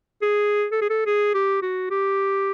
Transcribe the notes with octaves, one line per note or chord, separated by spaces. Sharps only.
G#4
A4
G#4
A4
G#4
G4
F#4
G4